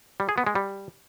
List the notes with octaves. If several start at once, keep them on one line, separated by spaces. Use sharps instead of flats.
G3
G#4
B3
G#3
G3